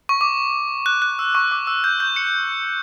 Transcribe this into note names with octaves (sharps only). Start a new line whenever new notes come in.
C#6
D6
F#6
F#6
E6
C#6
D6
E6
G6
G6
C#7